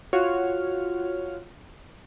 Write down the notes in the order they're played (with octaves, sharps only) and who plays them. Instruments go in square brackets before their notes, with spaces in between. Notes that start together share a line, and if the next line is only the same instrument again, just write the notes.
[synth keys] F4 F#4 C#5 F6